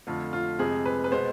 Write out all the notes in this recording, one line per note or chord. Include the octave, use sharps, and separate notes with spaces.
F2 D3 A3 F4
F4
F2 C3 G#3 C4 G#4
B4
B4
B2 G#3 B3 C5